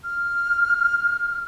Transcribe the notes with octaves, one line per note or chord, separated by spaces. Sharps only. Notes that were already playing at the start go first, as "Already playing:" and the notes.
F6